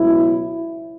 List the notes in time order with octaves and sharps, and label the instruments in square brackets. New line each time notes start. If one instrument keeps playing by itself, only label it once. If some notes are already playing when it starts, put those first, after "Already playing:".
Already playing: [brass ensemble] C#2 B2 F#3 E4